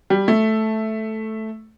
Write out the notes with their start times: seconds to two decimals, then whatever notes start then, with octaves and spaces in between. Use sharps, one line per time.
0.10 G3
0.28 A3